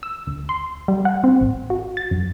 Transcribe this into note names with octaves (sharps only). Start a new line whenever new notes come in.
E6
D2
C6
G3
F#5
C4
A1
F#4
A6
F#2